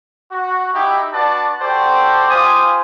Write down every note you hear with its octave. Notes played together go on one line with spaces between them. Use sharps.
F#4
D#4 E4 G4
D4 F#4 B4 D5 A5
F#4 G4 A4 C5 D5 G5
F4 G4 C5 G#5 D#6